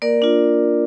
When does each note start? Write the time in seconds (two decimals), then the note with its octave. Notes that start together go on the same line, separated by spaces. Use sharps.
0.02 A#3 A#4 D5
0.22 D4 F4